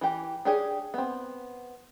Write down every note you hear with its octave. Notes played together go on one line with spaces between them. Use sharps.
E3 G4
D4 G4 G#4 C#5
B3 C4